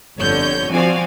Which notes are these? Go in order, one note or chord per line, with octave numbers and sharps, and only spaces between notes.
G1 F2 D3 C#5 G6
F3 C4 F#4 D5 F5 G#5